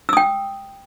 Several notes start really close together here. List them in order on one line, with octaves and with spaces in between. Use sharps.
E6 D#6 G5